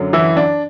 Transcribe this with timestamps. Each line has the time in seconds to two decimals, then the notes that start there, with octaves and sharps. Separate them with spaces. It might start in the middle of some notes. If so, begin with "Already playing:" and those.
Already playing: F#2 D3 F#3
0.13 E3 E4
0.37 D4